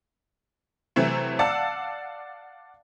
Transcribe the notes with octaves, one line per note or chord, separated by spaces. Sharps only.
C3 E3 F#3 A3 C4
D5 F5 F#5 A5 E6